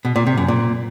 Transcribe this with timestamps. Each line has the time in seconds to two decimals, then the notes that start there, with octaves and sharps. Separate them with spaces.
0.05 B2
0.16 A#2
0.27 C3
0.37 F#2
0.48 A#2